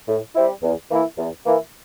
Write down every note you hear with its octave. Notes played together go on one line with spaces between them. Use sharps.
A2
G3 C4 E4
E2
E3 A#3 E4
E2
E3 A#3 E4